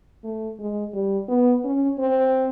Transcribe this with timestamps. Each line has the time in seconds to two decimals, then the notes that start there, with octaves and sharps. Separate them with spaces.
0.24 A3
0.59 G#3
0.93 G3
1.28 B3
1.64 C#4
1.99 C4